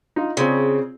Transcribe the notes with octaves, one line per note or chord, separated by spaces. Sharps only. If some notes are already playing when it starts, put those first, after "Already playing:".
D#4 F4
C#3 C4 F4 G#4